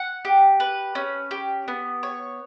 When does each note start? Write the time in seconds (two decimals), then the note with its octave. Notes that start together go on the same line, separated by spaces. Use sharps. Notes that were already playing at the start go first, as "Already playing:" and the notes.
Already playing: F#5
0.25 G4
0.60 B4
0.95 C#4
1.31 G4
1.68 B3
2.03 C#5